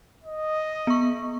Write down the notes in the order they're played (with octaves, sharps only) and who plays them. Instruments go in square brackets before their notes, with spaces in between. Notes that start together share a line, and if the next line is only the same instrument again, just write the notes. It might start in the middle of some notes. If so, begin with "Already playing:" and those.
[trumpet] D#5
[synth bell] B3 C#6